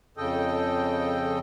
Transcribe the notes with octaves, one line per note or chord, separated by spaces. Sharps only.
F2 C#3 A4 D#5 G5